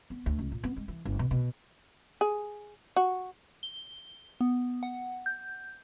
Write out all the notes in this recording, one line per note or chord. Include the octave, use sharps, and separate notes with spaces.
B3
D2
C#2
A#2
B3
G#3
E3
G1
B2
B2
G#4
F#4
G7
B3
F#5
G6